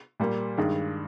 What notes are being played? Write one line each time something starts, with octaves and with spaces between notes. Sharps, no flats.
A#2 G3 A#3
G2 D#3 G#3